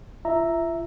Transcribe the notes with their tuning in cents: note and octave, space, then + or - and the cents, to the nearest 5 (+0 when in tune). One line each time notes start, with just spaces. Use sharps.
F4 -40 E5 +0 A#5 -5